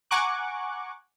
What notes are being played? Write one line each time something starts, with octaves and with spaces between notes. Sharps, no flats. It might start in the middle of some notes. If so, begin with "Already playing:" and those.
F#5 G#5 A#5 C#6 D6 F#6